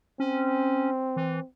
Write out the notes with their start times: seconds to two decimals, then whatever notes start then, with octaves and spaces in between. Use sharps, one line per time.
0.20 C4 C#4
1.16 E3